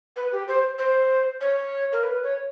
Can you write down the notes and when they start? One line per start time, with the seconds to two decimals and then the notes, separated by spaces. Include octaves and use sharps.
0.16 B4
0.32 G4
0.48 C5
0.78 C5
1.41 C#5
1.92 A#4
2.03 B4
2.24 C#5